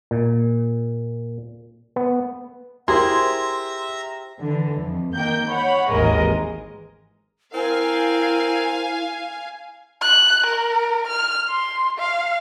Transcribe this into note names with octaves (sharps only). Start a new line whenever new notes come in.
A#2
B3
E4 G4 G#4 A#4 C5 E5 A#5 C6
D3 E3
F2
D#3 A#3 G5 G6
C#5 F#5 B5
G#1 D#2 E3 G#3 A#4 D#5
C4 E4 A#4 F5 G#5
F#6
A#4
F6
C6
F5